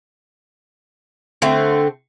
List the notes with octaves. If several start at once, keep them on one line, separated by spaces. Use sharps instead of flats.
D3 A3 C4